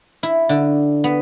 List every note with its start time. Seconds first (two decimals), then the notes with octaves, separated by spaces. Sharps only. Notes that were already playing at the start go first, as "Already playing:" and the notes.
0.23 E4
0.49 D3
1.04 B3